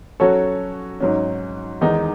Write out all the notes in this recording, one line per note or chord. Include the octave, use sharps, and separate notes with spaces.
F#3 C#4 F#4 A4 C#5
G#2 F#3 C#4
E2 D#3 G#3 D#4